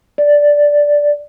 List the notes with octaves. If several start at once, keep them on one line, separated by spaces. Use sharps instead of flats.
D5